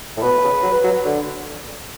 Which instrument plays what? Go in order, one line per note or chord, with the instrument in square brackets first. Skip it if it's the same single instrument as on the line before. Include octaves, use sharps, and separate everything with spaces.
[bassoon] A2
[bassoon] B2 [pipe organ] B4
[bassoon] C#3
F#3
F#3
D3